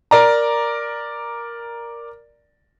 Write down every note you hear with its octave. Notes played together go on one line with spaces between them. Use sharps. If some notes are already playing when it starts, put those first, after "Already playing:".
A#4 D5 A#5